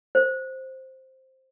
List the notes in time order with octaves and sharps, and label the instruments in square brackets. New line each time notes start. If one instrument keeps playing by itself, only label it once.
[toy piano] C5